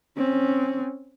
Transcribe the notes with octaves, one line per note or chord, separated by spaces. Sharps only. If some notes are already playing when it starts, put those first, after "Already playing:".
C4 C#4